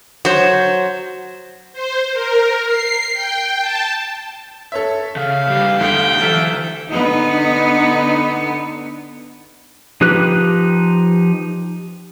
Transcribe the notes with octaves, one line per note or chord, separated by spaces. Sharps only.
F#3 C5
C5
A#4
C7
G5
A5
A4 C#5 E5
C#3 F5
A2 G3 G4
E2 D3 A3 D#4 G5
E3 F#3 A4 F6 B6
D3 B3 D#4
F3 D#4 G4 B4 F#6